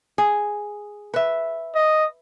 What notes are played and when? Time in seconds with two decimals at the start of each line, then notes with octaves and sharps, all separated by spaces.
0.18 G#4
1.14 B4 E5
1.75 D#5